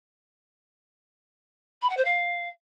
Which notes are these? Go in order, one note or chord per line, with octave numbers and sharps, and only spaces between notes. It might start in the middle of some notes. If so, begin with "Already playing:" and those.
B5
F#5
C5
F5